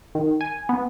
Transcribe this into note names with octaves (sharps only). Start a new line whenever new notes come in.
D#3
G#5
B3